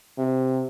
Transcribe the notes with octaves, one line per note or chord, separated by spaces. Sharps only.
C3